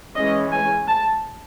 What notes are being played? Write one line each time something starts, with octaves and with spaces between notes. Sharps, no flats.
E3 G#3 C#4 D#5
G#5
A5